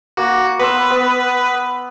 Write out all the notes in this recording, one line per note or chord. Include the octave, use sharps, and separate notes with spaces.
A#3 F#4
B3 B4 C6 E6
B3